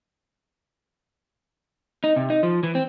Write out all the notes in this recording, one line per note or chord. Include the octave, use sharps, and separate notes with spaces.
D#4
C3
D#4
F3
E3
C4